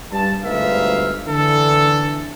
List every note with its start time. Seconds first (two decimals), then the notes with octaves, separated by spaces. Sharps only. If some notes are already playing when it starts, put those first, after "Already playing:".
0.13 G2 A5
0.43 G1 D2 G#2 B4 E5 F5
1.28 D3 E3 A4